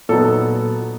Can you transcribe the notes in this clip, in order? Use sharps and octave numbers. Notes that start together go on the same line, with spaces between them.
A#2 F#3 B3 D#4 A4